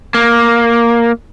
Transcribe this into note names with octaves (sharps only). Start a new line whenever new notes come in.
A#3